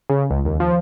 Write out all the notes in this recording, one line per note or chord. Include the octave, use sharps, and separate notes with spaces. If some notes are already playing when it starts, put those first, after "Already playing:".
C#3
C#2
D#2
F3